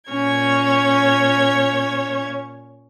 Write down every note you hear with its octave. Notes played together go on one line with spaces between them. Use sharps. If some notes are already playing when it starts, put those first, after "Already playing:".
A#2 C#4 C#5 G#6